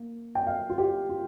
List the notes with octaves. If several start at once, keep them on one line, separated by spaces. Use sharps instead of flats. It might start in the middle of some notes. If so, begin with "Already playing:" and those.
Already playing: A#3
G5
F5
F4
G4
F4